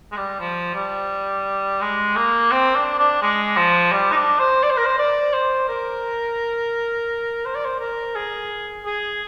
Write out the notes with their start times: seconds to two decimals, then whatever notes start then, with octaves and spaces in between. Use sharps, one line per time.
0.12 G#3
0.17 G3
0.40 F3
0.75 G3
1.81 G#3
2.16 A#3
2.52 C4
2.75 D4
2.99 D4
3.22 G#3
3.57 F3
3.92 G3
4.12 D#4
4.16 D4
4.39 C5
4.63 D5
4.70 C5
4.77 A#4
4.85 C5
4.99 D5
5.34 C5
5.69 A#4
7.45 C5
7.55 D5
7.65 C5
7.80 A#4
8.16 G#4
8.86 G#4